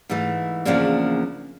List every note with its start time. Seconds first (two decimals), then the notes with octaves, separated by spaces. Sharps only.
0.09 G#2 E3 A3
0.65 E2 C#3 F3 A#3 D4